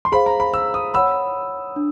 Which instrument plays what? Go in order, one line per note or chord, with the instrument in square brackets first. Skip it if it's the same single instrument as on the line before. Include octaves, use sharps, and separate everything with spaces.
[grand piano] C6
[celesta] G#4 C5 F5 [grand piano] B5
[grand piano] A#5
B5
E6
D#6
[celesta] C#5 F#5 B5 [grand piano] E6
[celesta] D4